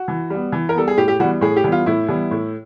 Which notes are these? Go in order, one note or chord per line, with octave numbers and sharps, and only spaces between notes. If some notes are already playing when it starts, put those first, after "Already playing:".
Already playing: F#4
E3
G3 B3
E3
A#4
G3 B3 A4
G#4
A2 G4
G4
E3 G3 B3 F#4
A2 G#4
G4
E3 G3 B3
F4
A2 E4
E3 G3 B3
A2